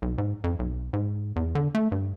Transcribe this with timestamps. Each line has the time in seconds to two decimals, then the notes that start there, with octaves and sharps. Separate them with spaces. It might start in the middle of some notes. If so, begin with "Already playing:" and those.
0.02 B1
0.18 G#2
0.44 F2
0.59 B1
0.93 G#2
1.36 E2
1.55 D3
1.75 A3
1.92 G2